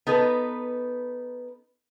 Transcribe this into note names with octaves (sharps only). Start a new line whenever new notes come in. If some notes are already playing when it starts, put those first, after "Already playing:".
B3 D#4 A4 B4